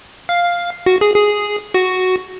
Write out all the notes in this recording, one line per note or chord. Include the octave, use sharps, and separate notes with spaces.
F5
F#4
G#4
G#4
F#4